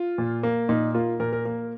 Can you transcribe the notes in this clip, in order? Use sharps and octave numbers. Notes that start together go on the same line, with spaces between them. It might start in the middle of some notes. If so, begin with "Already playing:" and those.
Already playing: F4
A#2
A#3
A#2 D#4
A#3 F4
A#2 A#4
A#4
A#3